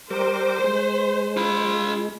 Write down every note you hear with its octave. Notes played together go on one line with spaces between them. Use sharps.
G3 A#4 C5 D6
G#3
F4 B5